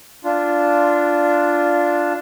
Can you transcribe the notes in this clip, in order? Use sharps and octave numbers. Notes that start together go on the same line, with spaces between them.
D4 F4